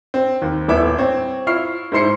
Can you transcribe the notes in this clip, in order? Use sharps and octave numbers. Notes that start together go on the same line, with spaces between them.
C4
D#2
D#1 A2 B3 B4 E5 D6
C4 C#5
E4 F4 C#6 F6 C7
G#2 E4 C5 C6 C7 C#7